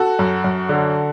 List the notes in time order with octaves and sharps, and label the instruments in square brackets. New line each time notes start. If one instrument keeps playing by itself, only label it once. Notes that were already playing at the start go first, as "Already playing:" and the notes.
Already playing: [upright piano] F#4 A4
F#2
F#2
D3